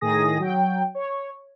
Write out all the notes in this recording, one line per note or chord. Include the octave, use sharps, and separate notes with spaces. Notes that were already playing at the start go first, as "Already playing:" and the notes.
A2 D#3 G#4 D#6 A#6
F#3 G5
C#5